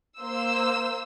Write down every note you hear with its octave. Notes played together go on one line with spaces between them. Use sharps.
A#3 C5 E6